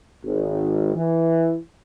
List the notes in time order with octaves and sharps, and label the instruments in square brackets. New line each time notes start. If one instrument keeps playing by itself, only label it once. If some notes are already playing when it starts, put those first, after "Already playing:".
[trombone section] G#1
E3